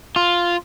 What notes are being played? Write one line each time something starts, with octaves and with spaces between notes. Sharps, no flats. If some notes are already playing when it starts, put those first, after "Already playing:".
F4